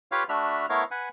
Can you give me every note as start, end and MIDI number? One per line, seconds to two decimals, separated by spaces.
0.12 0.23 65
0.12 0.23 67
0.12 0.23 71
0.12 0.23 73
0.12 0.23 77
0.29 0.66 57
0.29 0.66 62
0.29 0.66 66
0.29 0.66 76
0.29 0.66 83
0.29 0.66 89
0.69 0.84 57
0.69 0.84 59
0.69 0.84 64
0.69 0.84 70
0.69 0.84 73
0.69 0.84 77
0.91 1.09 71
0.91 1.09 78
0.91 1.09 80